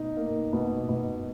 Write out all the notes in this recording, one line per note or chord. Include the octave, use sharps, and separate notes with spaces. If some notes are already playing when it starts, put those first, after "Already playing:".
Already playing: B2 D#4
A#3
B2
B2